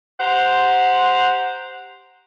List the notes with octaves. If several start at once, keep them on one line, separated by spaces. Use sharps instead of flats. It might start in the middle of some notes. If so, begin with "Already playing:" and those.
G4 C5 F#5 A#5 C6